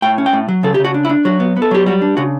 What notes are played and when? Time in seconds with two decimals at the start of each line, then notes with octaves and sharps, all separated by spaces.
0.02 A2 G5
0.18 C#4
0.26 G5
0.33 A2
0.48 F#3
0.63 C#3 A4
0.74 C#3 G4
0.85 F#4
0.94 D4
1.05 E4
1.09 D4
1.25 F#3 F#4
1.40 B3
1.56 B3
1.62 A4
1.71 F#3 G4
1.86 G3 F#4
2.02 D4
2.17 C#3 F#4